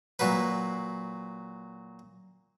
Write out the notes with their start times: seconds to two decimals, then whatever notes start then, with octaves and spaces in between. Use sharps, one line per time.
0.19 A#2 F#3 B4